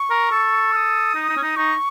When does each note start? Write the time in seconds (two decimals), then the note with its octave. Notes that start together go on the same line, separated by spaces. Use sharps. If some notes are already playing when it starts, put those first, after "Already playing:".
Already playing: C#6
0.10 A#4
0.31 A4
0.73 F6
0.76 D#6
1.15 D#4
1.29 D#4
1.37 C#4
1.42 D#4
1.56 D#4 C#6